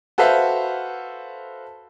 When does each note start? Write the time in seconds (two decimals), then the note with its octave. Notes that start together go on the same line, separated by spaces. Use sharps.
0.18 F#4 A4 B4 C5 E5 F5